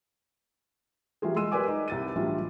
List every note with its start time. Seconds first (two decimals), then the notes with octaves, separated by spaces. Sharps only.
1.22 E3 F#3 G3 F4 G#4
1.36 G#3 C6 E6 D#7
1.52 G4 A#4 B4 D5 G#5 D6
1.67 D#4
1.88 C2 A6 D#7
2.16 A2 E3 F#3 G3 D4 F4